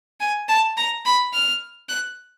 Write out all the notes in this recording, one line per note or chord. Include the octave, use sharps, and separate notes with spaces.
G#5
A5
A#5
B5
F6
F#6